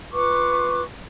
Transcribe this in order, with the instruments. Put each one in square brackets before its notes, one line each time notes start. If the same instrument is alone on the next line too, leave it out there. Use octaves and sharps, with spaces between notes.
[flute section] F4 B4 C#6 D6